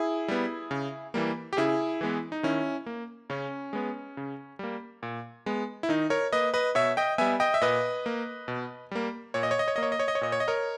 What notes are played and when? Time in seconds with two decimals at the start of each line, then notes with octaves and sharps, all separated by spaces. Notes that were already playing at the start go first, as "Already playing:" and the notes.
Already playing: E4 G#4
0.28 G3 B3
0.71 C#3
1.14 E3 G3 A#3
1.53 G4
1.57 C#3 E4 G#4
2.01 E3 G#3 B3
2.32 D#4
2.43 D#3 C#4 E4
2.86 A#3
3.30 C#3 C#4
3.73 G#3 B3
4.17 C#3
4.59 G3 A#3
5.03 A#2
5.46 G#3 B3
5.83 E4
5.89 D#3 D#4
6.10 A#4 C#5
6.33 A#3 B4 D#5
6.54 B4 D#5
6.75 B2 C#5 E5
6.97 D#5 G5
7.18 G3 B3 E5 G#5
7.40 D#5 G5
7.54 E5
7.61 A#2 B4 D#5
8.06 A#3
8.48 B2
8.91 G3 A#3
9.34 A#2 C#5
9.43 D#5
9.51 C#5
9.59 D#5
9.68 C#5
9.76 A#3 D#5
9.83 C#5
9.92 D#5
9.99 C#5
10.08 D#5
10.15 C#5
10.21 A#2 D#5
10.32 C#5
10.40 D#5
10.48 A#4 C#5